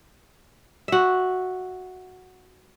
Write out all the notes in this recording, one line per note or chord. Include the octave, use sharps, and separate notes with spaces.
F#4 E5